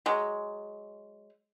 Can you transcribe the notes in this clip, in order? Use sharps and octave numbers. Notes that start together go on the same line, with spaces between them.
F#3 G#3